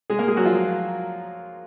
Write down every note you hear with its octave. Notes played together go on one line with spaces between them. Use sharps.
G#3 G#4
A#3 A#4
G#3 G#4
F#3 F#4
F3 F4